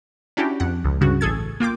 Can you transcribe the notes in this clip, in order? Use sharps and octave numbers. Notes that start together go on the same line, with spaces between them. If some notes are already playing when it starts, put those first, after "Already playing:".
C#4 D4 E4 F#4 G4
F2 F#5
C#2
G2 C#3 F#4
A1 G#4 A4 G#6
A#3 F4 G5 D6